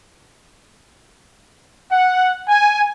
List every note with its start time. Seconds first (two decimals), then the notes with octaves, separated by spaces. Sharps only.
1.90 F#5
2.47 G#5